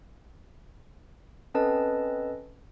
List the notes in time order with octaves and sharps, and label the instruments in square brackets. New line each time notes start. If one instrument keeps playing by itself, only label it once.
[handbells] C4 C#4 A4 B4 D#5 A5